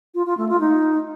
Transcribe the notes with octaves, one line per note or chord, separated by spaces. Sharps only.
F4
F4
A3
F4
D#4